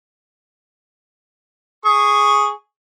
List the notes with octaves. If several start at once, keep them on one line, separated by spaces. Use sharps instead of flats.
G#4 C#6